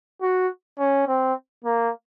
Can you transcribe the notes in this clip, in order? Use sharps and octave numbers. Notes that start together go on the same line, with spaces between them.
F#4
C#4
C4
A#3